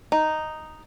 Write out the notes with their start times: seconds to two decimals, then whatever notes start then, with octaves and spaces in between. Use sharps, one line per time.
0.12 D#4